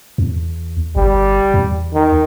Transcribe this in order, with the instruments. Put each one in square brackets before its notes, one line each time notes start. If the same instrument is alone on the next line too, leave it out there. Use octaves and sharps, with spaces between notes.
[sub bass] E2
[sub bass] G1 [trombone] G3
[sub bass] E2
[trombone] D#3